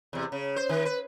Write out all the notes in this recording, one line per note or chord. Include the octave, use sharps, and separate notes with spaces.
E2 C3
C#3
C5
D#3
B4